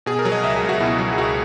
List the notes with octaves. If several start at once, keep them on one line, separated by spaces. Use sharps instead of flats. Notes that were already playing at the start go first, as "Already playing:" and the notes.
B2 G#4
A#4
F#3
D#5
C#2 E5
G#4
C#2
F#4
B2 E4
F#3
G#4
C#2 F#4